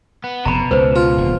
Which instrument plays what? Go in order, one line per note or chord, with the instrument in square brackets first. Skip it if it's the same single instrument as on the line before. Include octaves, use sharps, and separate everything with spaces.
[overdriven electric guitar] B3
[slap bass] F1 [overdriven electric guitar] B2 [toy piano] A#5 B5
[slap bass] C#2 [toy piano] B4 C5
[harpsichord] F4
[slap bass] D1